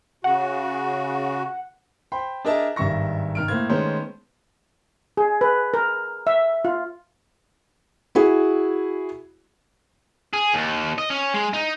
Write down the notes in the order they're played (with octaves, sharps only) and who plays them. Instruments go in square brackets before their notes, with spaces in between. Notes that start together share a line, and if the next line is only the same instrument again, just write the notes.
[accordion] C#3 F#4 [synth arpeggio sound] F#5
[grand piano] C5 G5 B5 C6
D4 G#4 A#4 D#5 E5 A5
G#1 G2 D#3 E5 C#6 A#6
D#3 F6 D7
A2 A#3 C5 G#6
D#3 G#3 A3 B3 C#4 C5
[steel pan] G#4
B4
A#4
E5
F4
[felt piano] E4 F#4 G#4
[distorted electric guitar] G#4
D#2
D#5
C#4
G#3
D#4